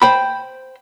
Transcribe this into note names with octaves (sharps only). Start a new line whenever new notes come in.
C5 G5 B5